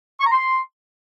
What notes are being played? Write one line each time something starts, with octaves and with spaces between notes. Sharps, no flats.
C#6
A#5
C6